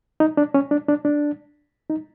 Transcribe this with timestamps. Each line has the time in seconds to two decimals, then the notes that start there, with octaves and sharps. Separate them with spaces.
0.20 D#4
0.37 D4
0.54 C#4
0.71 D4
0.88 D4
1.05 D4
1.90 D#4